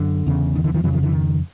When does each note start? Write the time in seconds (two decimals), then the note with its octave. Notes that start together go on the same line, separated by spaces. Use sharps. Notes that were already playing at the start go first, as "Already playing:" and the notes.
Already playing: F#2 D3
0.27 E2 C#3
0.55 D#3
0.64 D3 E3
0.74 D#3 F3
0.84 F2 C#3 E3 F#3
0.93 D#3 F3
1.03 D3 E3
1.12 D#3